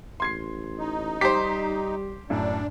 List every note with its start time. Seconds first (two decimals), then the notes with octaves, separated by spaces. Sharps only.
0.20 A1 C6 G#6 C7
0.78 D#4
1.21 G3 G4 C5 B6
2.30 F#2 A2 D4